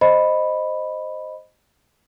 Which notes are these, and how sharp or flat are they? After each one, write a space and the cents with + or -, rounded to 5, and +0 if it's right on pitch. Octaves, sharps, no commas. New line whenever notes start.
C5 +0 D#5 -5 B5 +0